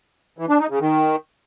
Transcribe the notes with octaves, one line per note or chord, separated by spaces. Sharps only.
E3
D4
D#4
C#3
D#3